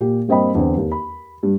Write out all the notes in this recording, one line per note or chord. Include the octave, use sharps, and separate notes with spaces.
A#2 G4
G2 A#3 C4 D#5 G5 B5
E2 D3 C4
D#2
B5
G2